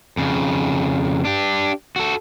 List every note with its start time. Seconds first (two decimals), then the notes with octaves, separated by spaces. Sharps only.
0.17 F2 C#3
1.25 D4 G4
1.96 F#4 A4